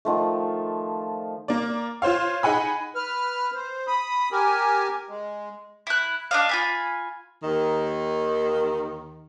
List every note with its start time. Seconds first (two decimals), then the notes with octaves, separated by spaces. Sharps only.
0.05 D#3 F3 A3
1.48 A#3 D5
2.02 F4 C5 C#5 F5
2.43 D#4 G#4 F#5 G#5 B5
2.95 B4 F6
3.55 C5
3.87 B5 D#6
4.32 G4 A#4 G#5
5.09 G#3
5.87 E4 F#6
6.31 D4 D#5 F5
6.49 F4 G#5 B5
7.43 D#2 D#3